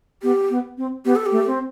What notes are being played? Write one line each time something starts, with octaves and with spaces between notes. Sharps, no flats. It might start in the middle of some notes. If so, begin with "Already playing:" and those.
B3 G4
B3
C4
B3 G4
A4
G4
A3
C4